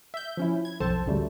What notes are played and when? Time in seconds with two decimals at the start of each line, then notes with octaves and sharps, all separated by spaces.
0.14 E5 G6
0.37 F3 C#4 E4
0.65 G#6
0.80 B1 F2 C4 A4 C5 A5
1.06 A1 D2 C#3 F#3 G3 A3